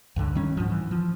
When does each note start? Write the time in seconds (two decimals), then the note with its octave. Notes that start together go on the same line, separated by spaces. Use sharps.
0.16 C#2 G2 D3
0.35 D#3 G3 C#4
0.57 G#2 F3
0.70 E3
0.91 F3